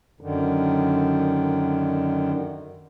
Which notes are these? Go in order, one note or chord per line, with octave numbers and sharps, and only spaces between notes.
F#2 D3 D#3